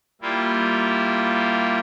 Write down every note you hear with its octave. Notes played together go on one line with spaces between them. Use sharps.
G3 A#3 E4 F4